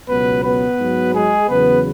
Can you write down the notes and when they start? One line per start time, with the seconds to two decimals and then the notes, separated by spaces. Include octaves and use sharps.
0.08 C#2 B2 F#3 B3 B4
0.43 B3 B4
0.78 G#2 F#3
1.13 G#3 G#4
1.48 E2 C#3 F#3 B3 B4